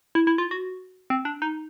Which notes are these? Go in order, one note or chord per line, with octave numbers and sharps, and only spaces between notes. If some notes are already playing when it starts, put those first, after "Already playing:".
E4
E4
F4
F#4
C4
D4
D#4